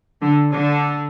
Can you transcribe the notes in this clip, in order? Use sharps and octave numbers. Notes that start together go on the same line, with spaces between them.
D3
D3